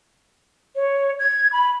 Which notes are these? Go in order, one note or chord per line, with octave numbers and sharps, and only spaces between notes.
C#5
G#6
B5